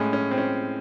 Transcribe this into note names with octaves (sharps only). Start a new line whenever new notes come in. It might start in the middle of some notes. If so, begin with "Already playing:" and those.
Already playing: A2 G#3 C#4
C#4
C4
C#4